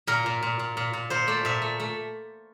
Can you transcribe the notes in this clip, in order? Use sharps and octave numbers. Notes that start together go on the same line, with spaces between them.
A#2 A#4
A#2
A#2
A#2
A#2
A#2
A#2 C5
A3 D5
A#2 E5
A3
A3